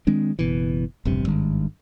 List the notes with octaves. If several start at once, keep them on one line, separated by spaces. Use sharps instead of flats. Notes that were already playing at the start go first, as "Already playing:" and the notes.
D#3 G#3 C4 D4
F#1 B2 E3
E1 A#1 G2 C3
G#1 G2 D#3 G#3